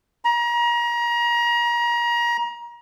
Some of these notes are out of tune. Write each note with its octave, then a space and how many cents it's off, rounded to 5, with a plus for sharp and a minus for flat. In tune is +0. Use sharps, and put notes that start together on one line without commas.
A#5 +30